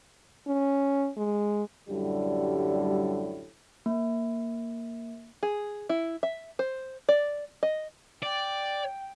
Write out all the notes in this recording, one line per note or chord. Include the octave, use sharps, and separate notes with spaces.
C#4
G#3
F#2 A2 D3 G3
A#3
G#4
E4
E5
C5
D5
D#5
D5 G5